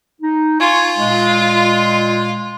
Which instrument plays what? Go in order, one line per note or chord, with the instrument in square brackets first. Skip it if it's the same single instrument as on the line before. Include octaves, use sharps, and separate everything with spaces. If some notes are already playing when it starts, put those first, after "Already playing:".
[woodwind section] D#4
[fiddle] F4 [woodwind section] G#5 C#6
[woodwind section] A#2 G#3